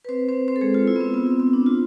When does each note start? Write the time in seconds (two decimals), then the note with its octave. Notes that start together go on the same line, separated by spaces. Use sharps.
0.05 B4
0.09 C4 C5
0.29 C4 C5
0.48 C4 C5
0.56 A4
0.61 G#3 G#4
0.74 F4
0.87 E4
0.96 B3
1.01 C4
1.14 B3
1.27 C4
1.40 C4
1.53 D4
1.66 F4